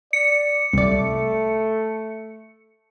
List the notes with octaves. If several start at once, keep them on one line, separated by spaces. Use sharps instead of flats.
D5 C#7
C2 A3 D5